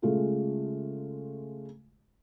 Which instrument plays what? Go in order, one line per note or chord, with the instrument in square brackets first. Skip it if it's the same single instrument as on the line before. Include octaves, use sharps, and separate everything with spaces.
[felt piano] C#3 G#3 A3 F4 G#4 A4